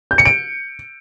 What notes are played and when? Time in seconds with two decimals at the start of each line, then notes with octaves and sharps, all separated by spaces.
0.11 G6
0.18 C#7
0.25 D7